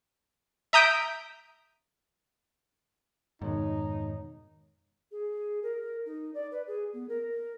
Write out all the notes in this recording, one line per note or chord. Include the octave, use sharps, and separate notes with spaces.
E5 A#5 D#6 G6 B6 D7
F2 G#2 B2 D#3 D#4 C#5
G#4
A#4
D#4
D5
B4
G#4
B3
A#4